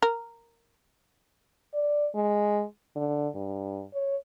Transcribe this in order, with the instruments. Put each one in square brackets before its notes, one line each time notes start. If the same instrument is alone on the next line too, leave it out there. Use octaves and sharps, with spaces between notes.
[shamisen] A#4
[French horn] D5
G#3
D3
G2
C#5